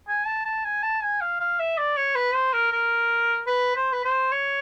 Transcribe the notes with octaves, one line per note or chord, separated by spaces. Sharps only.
G#5
A5
A5
G#5
A5
G#5
F5
F5
E5
D5
C#5
B4
C5
A#4
A#4
B4
C5
B4
C5
C#5